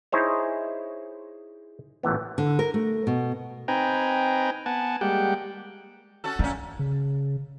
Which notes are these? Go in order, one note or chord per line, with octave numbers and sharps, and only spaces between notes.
D#4 E4 G#4 C5 C#5
A1 A#2 E3 B3
D3
A#4
A3
B2
C4 D#4 B4 G5 G#5 A#5
B3 F#5 G#5 A5
G3 G#3 A#3 G4 F#5 G5
C#4 F#4 A4
A#2 A3 C#4
C#3